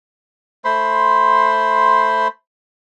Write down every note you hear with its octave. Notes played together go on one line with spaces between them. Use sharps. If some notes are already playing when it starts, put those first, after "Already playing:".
A3 C5 B5 C6